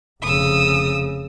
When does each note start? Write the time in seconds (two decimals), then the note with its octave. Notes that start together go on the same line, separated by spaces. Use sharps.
0.23 F1 C#3 D#6 E6